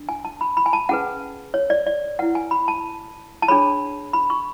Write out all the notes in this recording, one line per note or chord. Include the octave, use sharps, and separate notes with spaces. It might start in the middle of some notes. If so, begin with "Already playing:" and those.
Already playing: D4
G#5
A5
B5
B5
G#5
A5
C#4 G#4 B4 F#5
C#5
D5
D5
E4 B4 F#5
G#5
B5
A5
A5
D4 G#4 C#5 B5
B5
C#6